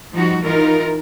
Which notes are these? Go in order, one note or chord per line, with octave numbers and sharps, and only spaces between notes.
F3 G3 D#4 F#4
E3 D#4 F4 A#4